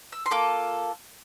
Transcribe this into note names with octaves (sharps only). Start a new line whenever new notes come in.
E6
C6
A#3 F4 A4 D6